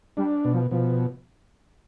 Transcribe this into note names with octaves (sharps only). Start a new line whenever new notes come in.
G3 D4
B2
F3
B2 F3